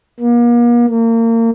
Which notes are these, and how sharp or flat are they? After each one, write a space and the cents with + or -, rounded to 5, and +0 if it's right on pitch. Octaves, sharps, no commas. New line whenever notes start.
A#3 +40
A#3 -30